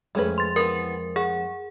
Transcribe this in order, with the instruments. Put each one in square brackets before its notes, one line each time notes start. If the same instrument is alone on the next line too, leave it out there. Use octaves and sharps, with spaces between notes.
[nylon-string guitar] F2 G#3 [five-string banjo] A3 C#4 B4
[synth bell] C6 A6
[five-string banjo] E3 F3 B3 [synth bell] A#4
[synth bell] G#4 [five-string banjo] F#5